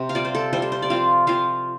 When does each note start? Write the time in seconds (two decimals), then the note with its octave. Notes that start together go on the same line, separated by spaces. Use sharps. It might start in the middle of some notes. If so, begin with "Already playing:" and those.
Already playing: C3 C4
0.09 F5
0.15 G3 F4 D5
0.25 C5
0.35 A4
0.53 G3 F4 C5
0.62 A4
0.72 C5
0.82 D5
0.90 F3 C4 F4 F5
1.27 F3 C4 F4 F5